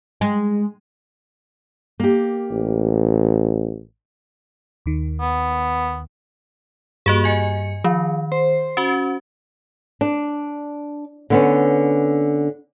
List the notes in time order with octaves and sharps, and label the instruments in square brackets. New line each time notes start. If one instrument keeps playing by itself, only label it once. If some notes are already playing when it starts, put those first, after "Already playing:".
[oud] G#3
[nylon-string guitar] A#3 G4
[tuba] A1
[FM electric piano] D#2 D#3
[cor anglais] B3
[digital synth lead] G2 [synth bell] A#3 F#4 G#4
[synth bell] D#5 G#5 C#7
[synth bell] D#3 [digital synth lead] F3
[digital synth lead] C5
[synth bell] C#4 F#4
[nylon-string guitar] D4
D3 B3 C#4